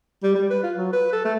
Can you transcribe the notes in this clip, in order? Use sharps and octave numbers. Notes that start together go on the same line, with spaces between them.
G3
G3
B4
F4
F#3
B4
A4
A3